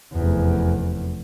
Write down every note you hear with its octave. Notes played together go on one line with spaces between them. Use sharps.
F1 E2